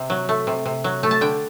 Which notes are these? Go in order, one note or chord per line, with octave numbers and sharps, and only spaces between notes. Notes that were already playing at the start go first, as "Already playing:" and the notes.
Already playing: C3
F#3
A3
C3
C3
F#3
A3
A5
D3 G5